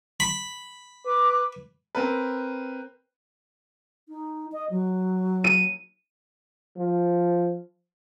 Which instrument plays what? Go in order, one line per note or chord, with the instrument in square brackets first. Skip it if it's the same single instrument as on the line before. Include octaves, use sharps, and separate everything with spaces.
[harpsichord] B5
[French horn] B4 [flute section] D6
[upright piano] C4 A#4 B4
[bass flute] D#4
D#5
F#3
[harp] D#7
[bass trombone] F3